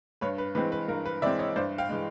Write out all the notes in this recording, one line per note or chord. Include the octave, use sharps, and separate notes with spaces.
G2 B4 C#5
B4
E3 G#3 C4 B4
B4
G2 A#4
B4
E3 G#3 C4 D5 E5
C#5 D#5
G2 C5 D5
F5 G5
E3 G#3